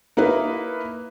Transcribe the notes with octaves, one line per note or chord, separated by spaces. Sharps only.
A#3 D#4 E4 B4